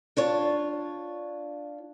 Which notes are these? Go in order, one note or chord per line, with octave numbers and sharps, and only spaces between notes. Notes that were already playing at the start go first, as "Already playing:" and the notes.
D4 F4 C#5